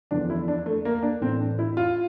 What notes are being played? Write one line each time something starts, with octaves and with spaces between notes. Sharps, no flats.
E2 D3 F3 D4
E4
D4
A3
A#3
D4
A2 E3 C4
D4
E4
F4